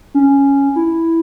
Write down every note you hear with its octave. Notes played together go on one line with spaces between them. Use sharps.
C#4
E4